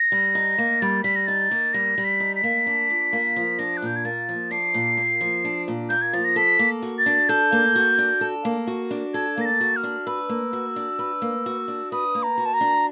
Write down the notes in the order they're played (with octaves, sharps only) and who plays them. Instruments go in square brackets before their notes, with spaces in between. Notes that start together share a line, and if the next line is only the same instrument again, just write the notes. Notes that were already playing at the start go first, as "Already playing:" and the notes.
Already playing: [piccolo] A#6
[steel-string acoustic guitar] G3
D#4
A#3
[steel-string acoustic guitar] G3 [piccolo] A6
[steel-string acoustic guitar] G3 [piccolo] B6
[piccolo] A#6
[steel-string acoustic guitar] D#4 [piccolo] A6
[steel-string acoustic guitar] A#3
[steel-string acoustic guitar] G3 [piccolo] A#6
[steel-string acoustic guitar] G3
[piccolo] B6
[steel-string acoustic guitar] D#4
[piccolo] B6
[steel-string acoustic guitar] A#3
D4
A#2
A#3
F3
[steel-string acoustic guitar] D4 [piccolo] A#6
[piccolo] F#6
[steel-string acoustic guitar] A#2 [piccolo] G6
[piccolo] G#6
[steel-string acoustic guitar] A#3 [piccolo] A6
[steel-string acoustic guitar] F3
[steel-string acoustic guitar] D4 [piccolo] C7
[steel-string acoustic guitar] A#2
A#3
F3
D4
A#2
[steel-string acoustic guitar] A#3 [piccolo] G6
[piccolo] G#6
[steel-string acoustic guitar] F3 [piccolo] A6
[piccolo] A#6
[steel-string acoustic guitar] A4 [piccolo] B6
[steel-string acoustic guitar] A#3
F#4
[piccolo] A6
[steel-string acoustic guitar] D4
[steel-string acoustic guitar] A4 [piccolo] G6
[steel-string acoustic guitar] A#3
F#4
D4
A4
A#3
F#4
D4
[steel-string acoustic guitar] A4 [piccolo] G#6
[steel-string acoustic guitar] A#3 [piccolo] A#6
[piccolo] A6
[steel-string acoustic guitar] F#4
[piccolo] F6
[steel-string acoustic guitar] D4
[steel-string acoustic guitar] B4 [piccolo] E6
[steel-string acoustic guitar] A#3
F#4
D4
B4
A#3
F#4
D4
[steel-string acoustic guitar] B4 [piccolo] D#6
[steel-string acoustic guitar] A#3
[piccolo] A#5
[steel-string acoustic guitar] F#4
[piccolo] A5
A#5
[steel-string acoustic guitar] D4